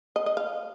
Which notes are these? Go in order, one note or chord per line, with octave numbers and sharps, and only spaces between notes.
D#5
D#5
F5